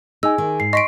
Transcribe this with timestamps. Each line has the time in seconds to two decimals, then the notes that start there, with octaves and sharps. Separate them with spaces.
0.23 D#4 G#4 G#5 E6
0.38 D#3
0.60 G#2 C7
0.73 D#5 C6 C#6 B6 D7